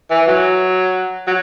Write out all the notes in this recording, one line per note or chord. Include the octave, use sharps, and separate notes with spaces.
E3
F#3
F#3